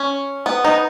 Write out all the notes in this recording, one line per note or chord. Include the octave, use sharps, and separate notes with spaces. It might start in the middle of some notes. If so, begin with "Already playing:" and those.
Already playing: C#4
B3
D#4